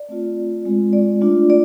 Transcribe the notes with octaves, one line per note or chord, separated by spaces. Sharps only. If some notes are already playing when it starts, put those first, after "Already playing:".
Already playing: D5
A3 C4 F4
G#3 C4 F4
D5
A3 D4 F4
D5